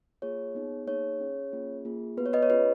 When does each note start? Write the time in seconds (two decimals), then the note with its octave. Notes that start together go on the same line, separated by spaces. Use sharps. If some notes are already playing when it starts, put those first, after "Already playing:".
0.22 A#3 F4 G#4 C#5
0.55 B3 D#4 G#4
0.87 A#3 D#4 G#4 C#5
1.20 C#4 G#4
1.52 A#3 C#4 F4 G#4
1.85 A#3 F4 G#4
2.17 B3 F#4 B4
2.26 C#5
2.33 B4 D#5
2.42 C#5
2.50 C#4 F4 G#4 B4